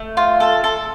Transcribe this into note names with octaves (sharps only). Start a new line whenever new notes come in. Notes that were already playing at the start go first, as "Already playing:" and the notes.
Already playing: A3
F4
A4
A4